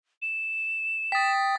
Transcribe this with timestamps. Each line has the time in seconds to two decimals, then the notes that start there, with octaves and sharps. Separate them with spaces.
0.22 E7
1.12 G5 D#6 A6 B6